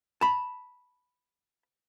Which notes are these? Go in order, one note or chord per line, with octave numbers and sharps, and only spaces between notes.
A5 B5